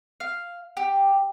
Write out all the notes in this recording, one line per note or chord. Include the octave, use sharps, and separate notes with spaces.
F5
G4